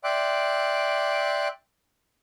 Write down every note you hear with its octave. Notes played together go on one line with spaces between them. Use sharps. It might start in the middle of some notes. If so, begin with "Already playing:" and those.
D5 E5 G5 C6 D6 F#6